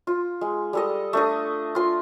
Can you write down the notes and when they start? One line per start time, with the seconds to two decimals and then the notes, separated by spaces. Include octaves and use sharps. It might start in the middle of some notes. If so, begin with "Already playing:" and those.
0.07 F4
0.41 G#3
0.73 G3 A4 D#5
1.13 A3 D4 D#5
1.75 F4 C6